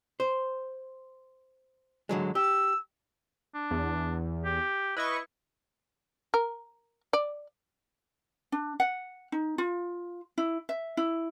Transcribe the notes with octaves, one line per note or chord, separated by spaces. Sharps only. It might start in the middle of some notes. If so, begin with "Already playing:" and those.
C5
D3 F#3 G#3
G4 E6
D4
E2
G4
E4 B4 D#5 C#6
A#4
D5
D4
F#5
D#4
F4
E4
E5
E4